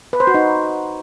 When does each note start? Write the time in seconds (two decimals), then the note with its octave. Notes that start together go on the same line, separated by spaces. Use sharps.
0.13 B4
0.20 C5
0.27 F#4
0.34 D#4